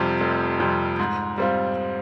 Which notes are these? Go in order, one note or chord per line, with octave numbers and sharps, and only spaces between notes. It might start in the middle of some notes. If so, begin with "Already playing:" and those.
Already playing: F1 F2 C3 G3
F1
F2 C3 G3
G#2
G3 C4 F4